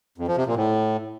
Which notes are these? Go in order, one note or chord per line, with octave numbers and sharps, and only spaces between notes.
F2
F3
C3
A#2
A2